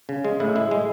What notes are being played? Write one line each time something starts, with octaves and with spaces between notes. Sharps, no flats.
C#3
G#3
A2 E4
G#3 E4
G#3